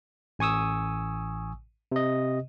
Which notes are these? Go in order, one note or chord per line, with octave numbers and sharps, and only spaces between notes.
A1 G#5 C#6 D#6 E6
C3 D#5